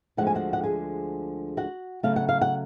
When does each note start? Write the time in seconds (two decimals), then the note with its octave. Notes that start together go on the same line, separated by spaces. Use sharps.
0.17 D2 D3 F3 G#3 F#5
0.27 G#5
0.35 F#4 F#5
0.53 F#5
0.63 G#4 G#5
1.57 F#4 F#5
2.03 C#3 F#3 A3 F5
2.16 F#5
2.29 F5
2.41 F#5